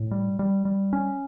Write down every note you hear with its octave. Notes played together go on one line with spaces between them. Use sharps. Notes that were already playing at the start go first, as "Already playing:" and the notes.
Already playing: A2
G3
G3
G3
C#4